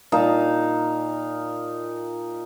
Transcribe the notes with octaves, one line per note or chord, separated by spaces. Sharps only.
A#2 D#4 F5 A5